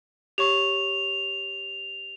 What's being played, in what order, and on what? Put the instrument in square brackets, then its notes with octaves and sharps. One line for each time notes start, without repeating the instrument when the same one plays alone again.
[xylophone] G4 C#5 C#6 [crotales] F7